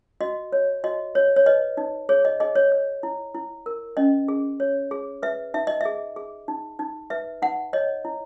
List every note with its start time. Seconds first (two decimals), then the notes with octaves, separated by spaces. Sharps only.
0.21 F#4 D#5
0.52 C#5
0.84 F#4 D#5
1.15 C#5
1.36 C#5
1.46 B4 D#5
1.77 D#4
2.09 G#4 C#5
2.25 D#5
2.40 G#4 D#5
2.55 C#5
2.72 C#5
3.03 E4
3.34 E4
3.66 A#4
3.97 C#4 D#5
4.28 G#4
4.60 C#5
4.91 G#4
5.23 B4 E5
5.54 D#4 E5
5.67 D#5
5.81 G#4 E5
6.16 G#4
6.48 D#4
6.79 D#4
7.10 B4 E5
7.42 D#4 F#5
7.73 C#5 D#5
8.05 E4